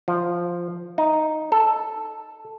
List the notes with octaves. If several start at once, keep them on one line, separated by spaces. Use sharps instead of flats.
F3
D#4
A4